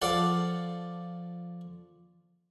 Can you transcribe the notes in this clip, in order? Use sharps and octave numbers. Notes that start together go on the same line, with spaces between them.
F3 A4 D5 F5 F#5